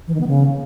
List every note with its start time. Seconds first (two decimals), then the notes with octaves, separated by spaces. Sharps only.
0.07 E3
0.14 D#3
0.21 B3
0.27 C#3